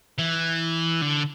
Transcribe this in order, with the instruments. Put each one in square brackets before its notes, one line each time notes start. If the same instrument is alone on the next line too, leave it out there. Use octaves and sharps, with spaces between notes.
[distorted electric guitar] E3
D3